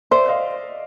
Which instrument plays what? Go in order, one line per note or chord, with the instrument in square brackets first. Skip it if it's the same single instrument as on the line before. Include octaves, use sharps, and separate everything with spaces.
[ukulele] C5 [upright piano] D5 E5
[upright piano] D#5 F5